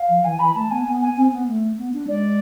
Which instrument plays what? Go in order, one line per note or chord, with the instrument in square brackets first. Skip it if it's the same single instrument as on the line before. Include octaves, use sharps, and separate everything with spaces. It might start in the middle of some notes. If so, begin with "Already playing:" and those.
Already playing: [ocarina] F5
[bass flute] F3
[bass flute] E3 [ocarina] G#5
[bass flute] E3 [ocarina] B5
[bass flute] A3 [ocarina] A5
[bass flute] B3 [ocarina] G#5
[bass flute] B3
[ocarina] G#5
[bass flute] C4
B3
A3
B3
D4
[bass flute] G#3 [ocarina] D5